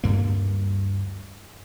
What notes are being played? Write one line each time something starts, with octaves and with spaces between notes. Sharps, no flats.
D2 G2 A#3